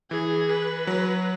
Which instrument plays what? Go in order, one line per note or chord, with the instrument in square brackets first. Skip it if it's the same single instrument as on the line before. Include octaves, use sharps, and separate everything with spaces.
[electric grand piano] E3 [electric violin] G#4
[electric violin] B4
[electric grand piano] F#3